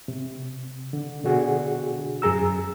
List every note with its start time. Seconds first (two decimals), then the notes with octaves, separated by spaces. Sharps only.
0.08 C3
0.93 D3
1.24 B2 D3 D4 F#4 G#4
2.22 F#2 G#4 A#5 E6